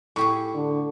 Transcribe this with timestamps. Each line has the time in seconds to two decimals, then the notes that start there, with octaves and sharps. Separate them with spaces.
0.16 A2 G4 G#4 C#6
0.55 D3